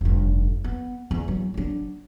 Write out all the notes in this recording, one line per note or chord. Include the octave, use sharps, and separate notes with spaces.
F1 G2
B3
E2
F#3
F#3 D4